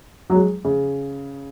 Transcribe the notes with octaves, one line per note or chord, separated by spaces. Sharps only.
F#3
G#3
C#3